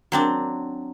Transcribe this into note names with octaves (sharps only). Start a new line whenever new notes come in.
F#3 C4 D4